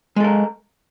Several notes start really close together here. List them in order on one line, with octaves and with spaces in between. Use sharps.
G#3 A4 A#4